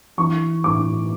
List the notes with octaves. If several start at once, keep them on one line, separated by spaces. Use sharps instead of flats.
E3 C#6
A2 D6